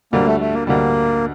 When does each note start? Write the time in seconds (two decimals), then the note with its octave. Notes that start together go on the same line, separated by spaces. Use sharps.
0.13 D2 D3 G3 A#3
0.27 A3
0.40 A3
0.54 A#3
0.67 D2 D3 G3 A#3